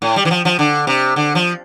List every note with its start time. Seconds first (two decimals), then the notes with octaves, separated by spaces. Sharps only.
0.02 A2
0.16 G3
0.25 E3
0.31 F3
0.45 F3
0.59 D3
0.87 C3
1.16 D3
1.35 F3